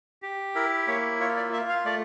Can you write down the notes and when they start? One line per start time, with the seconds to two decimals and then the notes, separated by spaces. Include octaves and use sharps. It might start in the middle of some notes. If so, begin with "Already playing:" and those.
0.22 G4
0.55 E4 A#4
0.88 A#3 C#5
1.20 F4 C#5
1.36 D5
1.53 F4 E5
1.69 F5
1.85 A3 D5